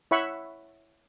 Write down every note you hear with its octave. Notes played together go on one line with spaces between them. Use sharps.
E4 C#5 E5 F#5 B5 C#6